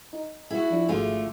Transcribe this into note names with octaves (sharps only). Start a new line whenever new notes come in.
D#4
E4 F#4 G#4
F3 D4
G#1 D3 A3 F4 F#4 G#4